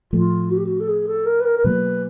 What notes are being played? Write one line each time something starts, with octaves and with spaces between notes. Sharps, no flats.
A2 F3 A3 F4
F#4
G4
F#4
A4
G#4
A4
A#4
B4
A#4
A#4
B2 F#3 A#3 B4